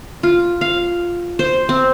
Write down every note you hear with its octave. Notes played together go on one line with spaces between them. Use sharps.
F4
F5
C5
C4